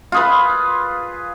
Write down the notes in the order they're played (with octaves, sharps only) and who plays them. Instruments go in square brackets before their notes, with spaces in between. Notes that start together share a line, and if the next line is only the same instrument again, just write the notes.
[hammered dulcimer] F4 G#4 B4